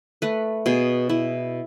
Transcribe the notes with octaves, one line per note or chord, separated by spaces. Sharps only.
A3 B4
B2 G#4
B2 E4